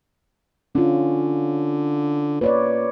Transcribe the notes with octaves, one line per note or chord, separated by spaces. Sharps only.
D3 C#4 F4
A#2 B4 C#5 D5